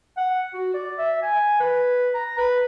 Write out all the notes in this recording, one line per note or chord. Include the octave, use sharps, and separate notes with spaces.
F#5
F#4
D5
E5
G#5
B4
A#5
B4